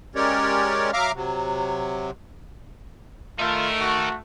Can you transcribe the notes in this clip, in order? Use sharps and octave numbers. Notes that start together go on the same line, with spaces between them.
G#3 C#4 G4 A#4 C#5 D5
F#3 E5 F5 A#5 D6 F6
C3 F#3
A3 D#4 F4 A#4
F#4